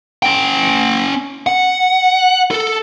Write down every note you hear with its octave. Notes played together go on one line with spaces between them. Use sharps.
C#4 G5
F#5
A4